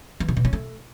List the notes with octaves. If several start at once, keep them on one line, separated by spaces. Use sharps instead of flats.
E3
C3
B2
C#4
A3